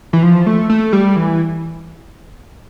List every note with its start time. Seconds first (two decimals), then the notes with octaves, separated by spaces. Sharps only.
0.13 E3
0.23 F3
0.46 A3
0.70 A3
0.93 G3
1.16 E3